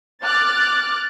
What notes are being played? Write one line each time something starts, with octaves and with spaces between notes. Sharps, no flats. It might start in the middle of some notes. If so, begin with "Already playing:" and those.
D6 F6 F#6 A6